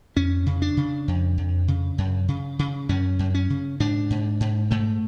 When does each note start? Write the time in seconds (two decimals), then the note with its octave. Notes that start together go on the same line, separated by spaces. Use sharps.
0.16 F2 C#4
0.46 C#3
0.62 D4
0.77 C#3
1.08 F2
1.38 F2
1.68 C#3
1.98 F#2
2.28 C#3
2.59 C#3
2.89 F#2 C#4
3.19 F#2
3.34 C#4
3.50 C#3
3.80 G#2 D4
4.10 G#2
4.40 G#2
4.71 G#2 A3